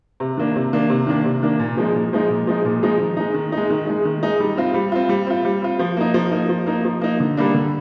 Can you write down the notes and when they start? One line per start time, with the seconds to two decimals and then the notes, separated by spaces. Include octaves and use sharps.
0.20 C3
0.38 D#3 A#3 D4
0.56 C3
0.73 D#3 A#3 D4
0.90 C3
1.07 D#3 A#3 D4
1.25 C3
1.43 D#3 A#3 D4
1.60 A#2
1.77 F3 G#3 D#4
1.95 A#2
2.13 F3 G#3 D#4
2.30 A#2
2.47 F3 G#3 D#4
2.65 A#2
2.83 F3 G#3 D#4
3.00 D#3
3.17 G#3 D#4
3.34 D#3
3.52 D#4
3.57 G#3
3.70 D#3
3.87 G#3 D#4
4.05 D#3
4.23 G#3 D#4
4.40 G3
4.57 C4 F4
4.74 G3
4.92 C4 F4
5.09 G3
5.27 C4 F4
5.45 G3
5.62 C4 F4
5.79 F3
5.97 A#3 D#4
6.14 F3
6.32 A#3 D#4
6.49 F3
6.66 A#3 D#4
6.85 F3
7.01 A#3 D#4
7.20 D3
7.37 G3 A#3 D4
7.55 D3